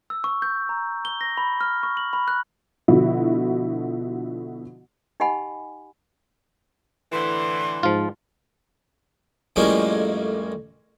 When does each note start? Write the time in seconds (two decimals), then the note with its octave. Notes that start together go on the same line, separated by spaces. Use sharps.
0.10 E6
0.24 C#6
0.42 G6
0.69 A#5
1.05 G7
1.21 A#6
1.37 B5
1.61 F6
1.83 C#6
1.97 F#7
2.13 B5
2.28 F#6
2.88 B2 D3 F3 E4 F#4
5.20 D#4 G4 D#5 F#5 G#5 B5
7.12 A2 D3 E3 C6
7.83 G#2 F3 F4
9.56 F2 A2 G3 G#3 A#3 C#4